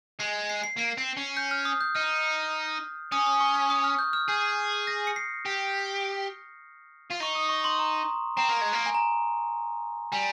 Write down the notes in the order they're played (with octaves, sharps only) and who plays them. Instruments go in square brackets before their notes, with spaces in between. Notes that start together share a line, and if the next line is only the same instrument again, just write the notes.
[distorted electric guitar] G#3 [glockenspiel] C7
[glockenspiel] C7
C7
[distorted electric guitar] A#3 [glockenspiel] C7
[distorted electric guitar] C4
C#4
[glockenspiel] G6
F6
D#6
G6
[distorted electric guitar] D#4 [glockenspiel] F6
[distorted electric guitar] C#4 [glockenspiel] D#6
[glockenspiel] D#6
C#6
C#6
D#6
F6
G6
F6
[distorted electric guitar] G#4 [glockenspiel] G6
[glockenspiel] A#6
C#7
C7
[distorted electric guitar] G4
F4
[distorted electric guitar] D#4 [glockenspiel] C#6
[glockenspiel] D#6
C#6
C6
A#5
[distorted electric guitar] C4 [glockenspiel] A#5
[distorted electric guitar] A#3
G#3
A#3
[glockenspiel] G#5
A#5
[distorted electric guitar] G3 [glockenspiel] G#5